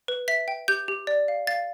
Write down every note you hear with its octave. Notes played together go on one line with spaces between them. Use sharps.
B4
E5 B6
G5
G4 G6
G4
D5
F5
F5 A6